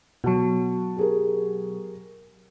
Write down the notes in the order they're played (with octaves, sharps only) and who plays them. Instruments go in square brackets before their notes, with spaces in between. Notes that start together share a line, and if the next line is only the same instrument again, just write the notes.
[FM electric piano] B2 F#3 [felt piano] F#4 A5
[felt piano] G4 G#4 A#4